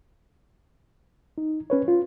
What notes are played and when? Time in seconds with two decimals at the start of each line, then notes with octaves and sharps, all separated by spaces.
1.38 D#4
1.70 C#4 B4 C#5
1.88 F4